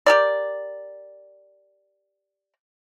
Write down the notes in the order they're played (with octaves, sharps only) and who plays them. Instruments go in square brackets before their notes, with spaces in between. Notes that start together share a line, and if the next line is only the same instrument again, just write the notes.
[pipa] G4 A#4 D5